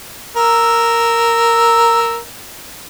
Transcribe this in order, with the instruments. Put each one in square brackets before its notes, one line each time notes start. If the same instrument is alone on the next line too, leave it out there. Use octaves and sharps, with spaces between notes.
[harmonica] A#4 E6